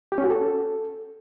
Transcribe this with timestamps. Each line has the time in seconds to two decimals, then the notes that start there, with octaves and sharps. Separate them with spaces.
0.12 G4
0.18 C#4
0.24 F#4
0.30 A4